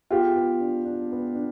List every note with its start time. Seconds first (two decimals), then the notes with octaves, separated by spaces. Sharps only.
0.11 B3 F4 G4
0.36 B3
0.61 D4
0.85 D4
1.11 B3
1.36 D4